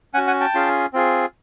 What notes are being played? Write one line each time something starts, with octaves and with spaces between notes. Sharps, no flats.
C#4 F#4 F#5 G#5
F#5 G#5
G5 A5
C#4 F4 G#4
C4 F4 G#4